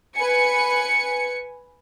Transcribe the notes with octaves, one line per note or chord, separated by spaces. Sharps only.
B4 G#5 C#7